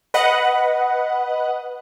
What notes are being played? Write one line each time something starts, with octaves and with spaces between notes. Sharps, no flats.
B4 D#5 F#5